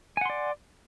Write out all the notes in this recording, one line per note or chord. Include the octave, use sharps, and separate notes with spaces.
D5 F#5 G#5 C6